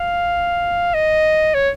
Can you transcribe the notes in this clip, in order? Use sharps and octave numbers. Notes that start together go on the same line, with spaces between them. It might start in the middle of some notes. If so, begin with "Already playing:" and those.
Already playing: F5
D#5
C#5